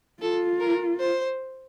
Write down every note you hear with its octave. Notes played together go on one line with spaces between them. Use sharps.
F4 A4
A#4
C5